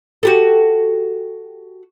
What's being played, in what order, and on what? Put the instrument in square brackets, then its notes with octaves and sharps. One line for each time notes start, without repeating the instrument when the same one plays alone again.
[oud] F#4 G4 A4